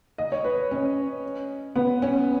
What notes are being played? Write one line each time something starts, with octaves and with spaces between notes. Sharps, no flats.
D#5
C#5
B4
C#4
B3
C#4